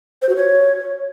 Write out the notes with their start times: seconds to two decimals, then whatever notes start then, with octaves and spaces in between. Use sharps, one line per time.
0.22 C5
0.29 F#4
0.36 C#5